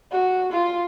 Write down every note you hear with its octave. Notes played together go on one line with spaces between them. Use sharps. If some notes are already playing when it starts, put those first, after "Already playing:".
F#4
F4